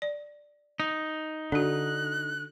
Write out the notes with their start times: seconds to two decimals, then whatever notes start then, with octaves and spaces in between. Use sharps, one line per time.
0.02 D5
0.80 D#4
1.52 D3 D4 F#4 F#6